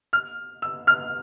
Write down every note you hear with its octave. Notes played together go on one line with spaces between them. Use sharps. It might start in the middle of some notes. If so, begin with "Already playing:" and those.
F6
E6
F6